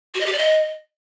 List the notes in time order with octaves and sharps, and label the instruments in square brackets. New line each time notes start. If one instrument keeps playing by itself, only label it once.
[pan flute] F#4
D#5
G4
D5
D#5